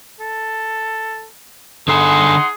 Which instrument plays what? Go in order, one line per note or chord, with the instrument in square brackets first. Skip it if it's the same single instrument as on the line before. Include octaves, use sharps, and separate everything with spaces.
[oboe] A4
[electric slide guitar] D3 A4 G#5 [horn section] D#4 F#5 C6 [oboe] G#4